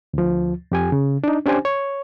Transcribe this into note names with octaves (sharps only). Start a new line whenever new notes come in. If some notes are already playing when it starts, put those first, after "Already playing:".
D2 F3
F2 G4 G#5
C#3
D4 D#4
C#4 D4 G4 C5 G#5
C#5